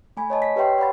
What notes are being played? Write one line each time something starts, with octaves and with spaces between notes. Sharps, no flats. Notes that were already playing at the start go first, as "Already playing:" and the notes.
A3 G#5 B5
C#5 D#5 A5
B6
G4 B4 C#5 E5 G5 C6
D5 F#5 B5 A6